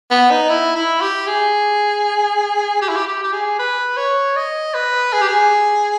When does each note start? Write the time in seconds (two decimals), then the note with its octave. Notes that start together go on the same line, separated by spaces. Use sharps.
0.10 B3
0.30 D#4
0.49 E4
0.76 E4
1.01 G4
1.27 G#4
2.82 G4
2.89 E4
2.96 G4
3.07 G4
3.23 G4
3.33 G#4
3.59 B4
3.97 C#5
4.36 D#5
4.74 B4
5.13 G#4
5.21 G4
5.28 G#4